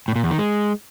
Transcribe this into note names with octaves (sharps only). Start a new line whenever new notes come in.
A2
A#2
E2
D#3
G#3